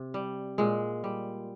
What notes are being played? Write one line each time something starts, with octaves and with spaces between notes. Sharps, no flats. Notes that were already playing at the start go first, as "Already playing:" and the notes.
Already playing: C3
G3
A#2 G#3
G3